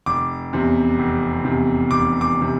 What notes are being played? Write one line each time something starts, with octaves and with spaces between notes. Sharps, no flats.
F1 D6
E2 C3
F1
E2 C3
F1 D6
D6
C3